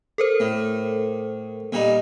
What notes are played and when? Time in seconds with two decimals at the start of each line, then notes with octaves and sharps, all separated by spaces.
0.18 A4 A#4 C5
0.40 A2
1.72 A#2 G3 D#4